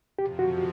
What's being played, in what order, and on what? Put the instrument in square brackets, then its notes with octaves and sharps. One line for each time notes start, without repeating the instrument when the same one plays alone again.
[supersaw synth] F2 C3 F3 [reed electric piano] G4
[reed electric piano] F#4